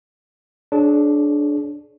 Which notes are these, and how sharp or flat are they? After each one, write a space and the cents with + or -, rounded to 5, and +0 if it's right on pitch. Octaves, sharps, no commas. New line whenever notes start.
D4 +0 G#4 +40 C#5 -10